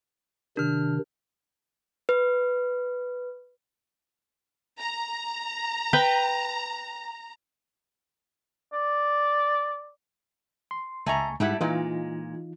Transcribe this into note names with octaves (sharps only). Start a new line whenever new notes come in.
C3 D#3 D4 F6
B4
A#5
B4 G5
D5
C6
C#2 A3 D#5 G#5 A#5 C#6
G#2 G3 A3 E4 F#5
A#2 E3 G#3 D#4 F4